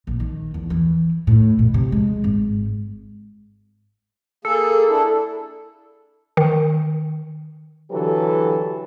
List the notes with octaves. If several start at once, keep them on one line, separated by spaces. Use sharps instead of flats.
A#1
D#3
E2
E3
A2
B2
C3
G#3
G#1
A#3 G#4 A4
D4 E4
D#3
D3 E3 F#3 G4 A4 B4